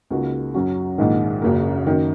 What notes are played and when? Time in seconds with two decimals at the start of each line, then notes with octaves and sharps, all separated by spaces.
0.10 C#2 C#3 A#3 D#4 F#4
0.54 F#2 F#3 C#4 F#4
0.98 A#1 G#2 D#3
1.42 F#1 F#2 C#3 A#3
1.87 F#2 D#3